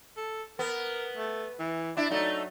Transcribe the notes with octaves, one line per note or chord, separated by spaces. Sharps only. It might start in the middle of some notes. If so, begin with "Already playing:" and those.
A4
B3 A#4
A3
E3
D4 E4
F#3 A3 D#4